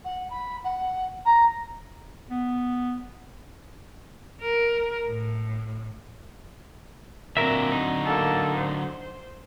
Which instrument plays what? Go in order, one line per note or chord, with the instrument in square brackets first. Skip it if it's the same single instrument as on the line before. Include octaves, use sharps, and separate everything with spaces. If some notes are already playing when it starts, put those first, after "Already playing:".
[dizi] F#5
B5
F#5
A#5
[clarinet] B3
[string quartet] A#4
A2
[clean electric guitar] A#2 A#4 E5 [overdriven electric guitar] D3 F#3 [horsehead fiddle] C4
[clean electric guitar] D#4
[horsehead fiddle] A#3 A4
C5